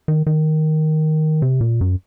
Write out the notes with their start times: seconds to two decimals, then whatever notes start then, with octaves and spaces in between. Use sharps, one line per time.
0.08 D#3
0.27 D#3
1.42 C3
1.61 A#2
1.81 F#2